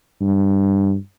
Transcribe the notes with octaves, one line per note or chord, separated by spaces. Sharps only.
G2